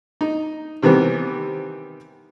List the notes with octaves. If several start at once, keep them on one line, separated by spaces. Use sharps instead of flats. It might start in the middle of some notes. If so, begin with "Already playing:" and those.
D#4
C3 D#3 E3 G3 B3 C4